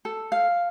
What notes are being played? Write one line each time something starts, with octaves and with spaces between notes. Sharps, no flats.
A4
F5